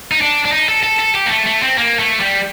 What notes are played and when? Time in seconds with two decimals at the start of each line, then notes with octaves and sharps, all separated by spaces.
0.11 D#4
0.21 D4
0.45 D4
0.52 D#4
0.68 A4
0.83 A4
0.99 A4
1.15 G4
1.26 A#3
1.30 A3
1.46 A3
1.63 C4
1.78 A#3
1.99 A3
2.20 G3